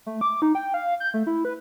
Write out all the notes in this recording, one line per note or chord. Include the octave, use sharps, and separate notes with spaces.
A3
D6
D#4
G5
F5
G6
A3
E4
B4